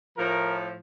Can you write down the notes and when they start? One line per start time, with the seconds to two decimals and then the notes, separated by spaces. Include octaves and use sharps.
0.17 A2 F3 A#4